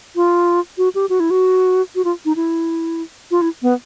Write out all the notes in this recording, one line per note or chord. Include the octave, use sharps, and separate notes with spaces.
F4
F#4
G4
F#4
E4
F#4
F#4
F4
D#4
E4
F4
E4
B3